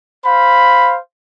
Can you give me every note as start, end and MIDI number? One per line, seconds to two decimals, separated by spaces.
0.25 0.97 72
0.25 0.97 77
0.25 0.97 83